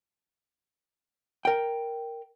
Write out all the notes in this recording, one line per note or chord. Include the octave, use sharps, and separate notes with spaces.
A#4 G5